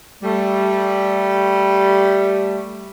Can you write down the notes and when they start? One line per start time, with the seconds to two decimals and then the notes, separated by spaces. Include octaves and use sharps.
0.23 G3 A3